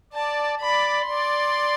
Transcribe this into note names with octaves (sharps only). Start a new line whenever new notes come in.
D5 A5
D5 B5
D5 C6